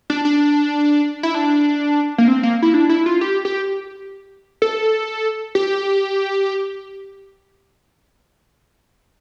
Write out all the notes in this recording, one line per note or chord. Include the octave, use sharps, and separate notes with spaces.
D4
D4
E4
D4
A#3
C4
A#3
E4
D4
E4
F4
G4
G4
A4
G4